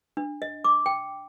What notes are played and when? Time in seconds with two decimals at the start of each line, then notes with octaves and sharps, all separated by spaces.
0.17 D4
0.42 D#5
0.64 D6
0.86 G5